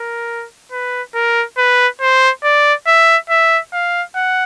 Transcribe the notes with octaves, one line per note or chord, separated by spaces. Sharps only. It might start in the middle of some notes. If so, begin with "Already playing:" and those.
Already playing: A#4
B4
A#4
B4
C5
D5
E5
E5
F5
F#5